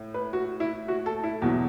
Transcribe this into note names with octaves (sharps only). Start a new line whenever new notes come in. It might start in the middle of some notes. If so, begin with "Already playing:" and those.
Already playing: A2
B4
F#4
E4
F#4
A4
E4
E2 B2 F#3